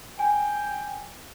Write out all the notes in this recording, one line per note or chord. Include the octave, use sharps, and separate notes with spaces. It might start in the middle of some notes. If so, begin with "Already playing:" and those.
G5 G#5